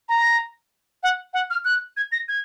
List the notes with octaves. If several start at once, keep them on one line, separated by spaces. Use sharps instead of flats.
A#5
F#5
F#5
F6
F#6
G#6
A#6
G#6